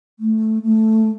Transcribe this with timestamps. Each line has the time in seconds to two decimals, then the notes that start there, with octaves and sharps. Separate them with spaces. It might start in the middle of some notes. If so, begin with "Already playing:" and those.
0.19 A3
0.63 A3